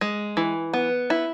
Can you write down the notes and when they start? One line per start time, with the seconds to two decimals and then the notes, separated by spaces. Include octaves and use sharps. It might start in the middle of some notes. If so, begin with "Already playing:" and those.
0.01 G#3
0.37 E3
0.73 B3
1.10 E4